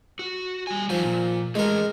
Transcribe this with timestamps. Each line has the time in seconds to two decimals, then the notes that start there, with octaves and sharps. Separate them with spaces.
0.19 F#4
0.67 G3 G#5
0.90 F#2 D#3 F3 G#5
1.05 A#2
1.55 E3 G#3 A3 A#4